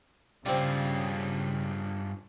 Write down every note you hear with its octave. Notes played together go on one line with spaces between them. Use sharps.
G2 C#3 G3 C4 F4